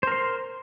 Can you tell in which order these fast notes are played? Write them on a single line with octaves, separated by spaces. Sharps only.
C5 A#4 C6